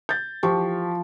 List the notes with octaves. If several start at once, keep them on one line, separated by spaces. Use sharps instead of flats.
G6 A6
F3 G4 C#6